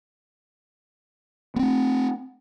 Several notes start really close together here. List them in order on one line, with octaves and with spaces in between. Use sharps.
B3 C4 A3